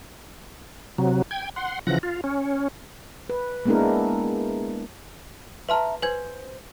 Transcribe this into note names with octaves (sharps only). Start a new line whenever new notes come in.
C3 F#3
G5 G#6
F#5 C6
C#3 E3 F3 F#5 A#6
F4
C#4
B4
G#3 A#3 B3 D4 E4 A#4
B4 E5 A5 A#5 C6 F6
B4 C5 G#5 G#6